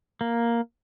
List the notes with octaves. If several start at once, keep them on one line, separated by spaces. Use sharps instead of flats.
A#3